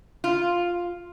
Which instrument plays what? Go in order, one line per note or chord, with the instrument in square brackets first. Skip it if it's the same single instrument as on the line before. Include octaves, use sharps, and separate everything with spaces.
[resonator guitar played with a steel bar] F4